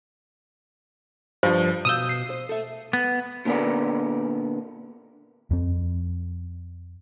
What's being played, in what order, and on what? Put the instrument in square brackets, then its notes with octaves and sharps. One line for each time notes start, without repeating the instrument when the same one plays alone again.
[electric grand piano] G2 F3 [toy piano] C5
[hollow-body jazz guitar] B2 F5 [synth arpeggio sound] D#6 E6 G6
[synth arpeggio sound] C7
[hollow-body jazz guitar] C5
A4 E5
[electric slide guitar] B3
[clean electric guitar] A#2 D3 B3 A#4 D5
[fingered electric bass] F2 C4